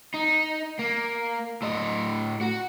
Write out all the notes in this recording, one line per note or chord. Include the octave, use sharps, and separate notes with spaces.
D#4
A#3
A2 D#5
F#4